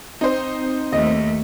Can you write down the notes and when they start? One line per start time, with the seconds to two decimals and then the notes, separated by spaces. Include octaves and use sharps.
0.21 C4 D#4 C5
0.93 D#2 A3 D#5